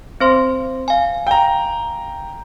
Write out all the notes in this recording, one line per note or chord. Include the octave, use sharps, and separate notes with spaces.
C4 C5 C6
F5 G#5
G5 A#5